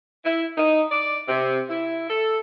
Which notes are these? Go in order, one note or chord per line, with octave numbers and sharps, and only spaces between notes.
E4
D#4
D5
C3
E4
A4